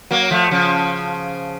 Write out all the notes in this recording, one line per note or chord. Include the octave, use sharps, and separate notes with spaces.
F#3 A#3
F3 A3
C#3 F3